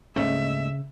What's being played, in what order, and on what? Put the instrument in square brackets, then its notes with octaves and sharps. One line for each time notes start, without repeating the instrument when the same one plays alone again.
[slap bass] D2 G#2 A3 [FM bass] C#3 [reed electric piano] A#3 C#4 D#5 [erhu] E5